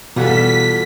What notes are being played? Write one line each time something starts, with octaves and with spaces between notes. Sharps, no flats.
E2 B2 G3 F4 F#4 A4 F#5 B6